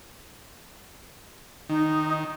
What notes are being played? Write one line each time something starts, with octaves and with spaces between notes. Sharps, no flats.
D#3 D#4